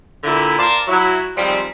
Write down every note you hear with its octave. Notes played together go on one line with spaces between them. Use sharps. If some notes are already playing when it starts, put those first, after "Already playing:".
A#2 D3 E4
A#4 C5 D5 F5 A5
F#3 E4
D#3 F3 G3 G#3 C4